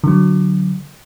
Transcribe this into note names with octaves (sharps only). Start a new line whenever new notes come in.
D3 F#3